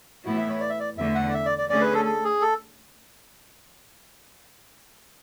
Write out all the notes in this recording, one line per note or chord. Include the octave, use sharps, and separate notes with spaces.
A2 E3 B3 E4 F#4
E5
C#5
D5
E5
D5
E2 D3 A3 E5
F#5
D5
E5
D5
D5
D3 A3 C#4 G#4 D5
B4
A4
A4
G#4
A4